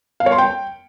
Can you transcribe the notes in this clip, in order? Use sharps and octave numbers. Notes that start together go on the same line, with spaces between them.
F5
C#5
C6
G5